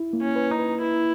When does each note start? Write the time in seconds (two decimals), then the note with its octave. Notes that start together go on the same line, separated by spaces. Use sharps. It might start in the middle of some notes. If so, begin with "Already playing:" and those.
Already playing: E4
0.13 A#3
0.21 C#4
0.36 B4
0.51 D#4
0.59 B4
0.82 E4 B4